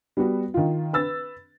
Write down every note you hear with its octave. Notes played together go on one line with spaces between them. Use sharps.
G3 B3 F#4
D#3 F4
B4 E6 A6